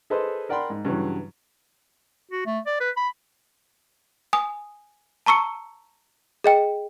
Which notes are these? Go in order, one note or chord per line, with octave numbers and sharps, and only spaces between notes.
G#4 A4 B4 C5 D#5 C6
A#4 D5 F#5 G5 B5 C6
G#2
G2 C#3 E3 F#3
F#4
A3
D5
B4
B5
G#5 D#6
A5 A#5 C#6 E6 C#7
G#4 D#5 G5